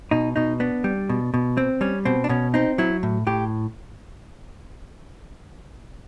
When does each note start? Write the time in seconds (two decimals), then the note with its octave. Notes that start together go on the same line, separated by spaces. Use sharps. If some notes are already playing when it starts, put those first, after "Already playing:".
0.11 B2 D#4
0.36 B2 D#4
0.60 B3 D4
0.84 G3
1.09 B2
1.34 B2
1.57 C4
1.81 G3 C#4
2.05 B2 C4
2.24 D4
2.29 B2 C#4
2.54 C4 D#4
2.78 F#3 E4
3.03 A2
3.27 A2 G4